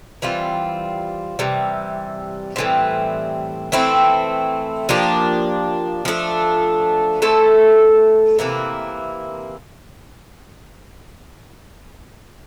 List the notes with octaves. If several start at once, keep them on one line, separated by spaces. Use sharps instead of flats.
E3 G3 C4 F4
C3 E3 G3
A2 E3 G3 C4
E3 A3 C4 E4
F3 A#3 D4 G4
F3 A3 D4
A3 E4 A4 C5
C3 E3 A#3 E4